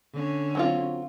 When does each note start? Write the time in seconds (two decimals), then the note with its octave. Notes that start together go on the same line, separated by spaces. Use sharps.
0.14 D3 C#4
0.55 F#3 C4 F4